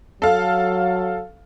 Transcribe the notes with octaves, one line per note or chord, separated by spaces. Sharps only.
F#3 A4 F5